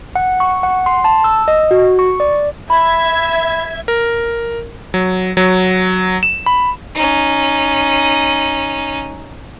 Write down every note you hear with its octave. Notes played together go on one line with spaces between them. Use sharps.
F#5
C#6
F#5
C6
A5
E6
D#5
F#4
C#6
D5
E5 B5 G#6
A#4
F#3
F#3
E7
B5
C#4 D#4